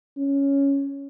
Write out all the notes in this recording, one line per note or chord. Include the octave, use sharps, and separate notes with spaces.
C#4